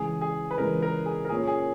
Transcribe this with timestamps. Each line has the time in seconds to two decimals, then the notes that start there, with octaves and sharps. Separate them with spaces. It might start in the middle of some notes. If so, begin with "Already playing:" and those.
Already playing: C#3 E3 G#3 G#4
0.21 G#4
0.51 B4
0.58 C#3 E3 G#3 A#4
0.82 A#4
1.06 G#4
1.25 A#4
1.29 A#2 A#3 C#4 G#4
1.47 G#4